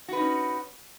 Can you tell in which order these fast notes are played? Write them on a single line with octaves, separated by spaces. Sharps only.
F#4 B4 D#4 C#4